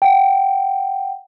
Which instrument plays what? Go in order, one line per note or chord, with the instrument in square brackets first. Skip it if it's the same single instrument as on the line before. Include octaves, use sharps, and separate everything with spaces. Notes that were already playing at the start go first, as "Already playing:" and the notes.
[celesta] F#5 G5